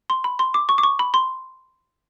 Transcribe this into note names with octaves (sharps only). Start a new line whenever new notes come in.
C6
B5
C6
D6
C#6
D6
C#6
B5
C6